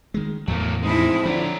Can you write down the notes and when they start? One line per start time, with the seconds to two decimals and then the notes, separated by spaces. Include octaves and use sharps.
0.14 D#3 G#3
0.48 E2 A2 F#3 A3 A#3
0.83 F3 G#3 C4 D#4 E4
1.25 D3 F3 C5 C#5 A#5